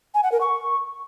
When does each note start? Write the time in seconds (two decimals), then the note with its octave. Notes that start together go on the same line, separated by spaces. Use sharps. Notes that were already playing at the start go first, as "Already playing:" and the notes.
0.14 G#5
0.23 F#5
0.32 A#4
0.41 C#6